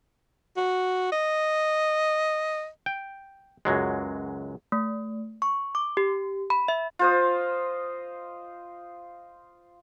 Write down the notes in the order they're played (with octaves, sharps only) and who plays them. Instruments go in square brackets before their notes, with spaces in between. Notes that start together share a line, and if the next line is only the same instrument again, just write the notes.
[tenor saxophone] F#4
D#5
[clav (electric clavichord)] G5
C#2 F#2 F#3 G#3
[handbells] A3
C#6
D6
G4
B5
E5
[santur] F4 C5 D#5